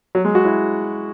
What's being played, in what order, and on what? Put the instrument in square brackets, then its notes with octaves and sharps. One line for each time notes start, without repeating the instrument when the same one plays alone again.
[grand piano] F#3
G#3
F#4
E4